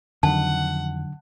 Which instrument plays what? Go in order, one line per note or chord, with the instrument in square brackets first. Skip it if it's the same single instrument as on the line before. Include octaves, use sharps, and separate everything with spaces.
[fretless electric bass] F2 D#3 [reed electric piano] D3 F#3 [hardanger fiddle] F#5 [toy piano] A5